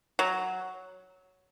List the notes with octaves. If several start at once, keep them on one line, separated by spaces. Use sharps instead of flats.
F#3